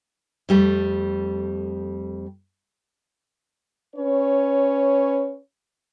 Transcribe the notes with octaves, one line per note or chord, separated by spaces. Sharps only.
F2 G3 A3
C#4 B4 C#5